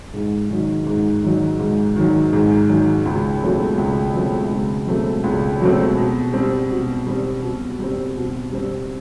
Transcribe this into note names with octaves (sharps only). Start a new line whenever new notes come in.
G#2
D#3 F#3
G#2
D#3 F#3
G#2
D#3 F#3
G#2
D#3 F#3
C#2
B2 F#3 A3 C4
C#2
B2 F#3 A3 C4
C#2
B2 F#3 A3 C4
C#2
B2 F#3 A3 C4
B2
G3 C4
B2
G3 C4
B2
G3 C4
B2
G3 C4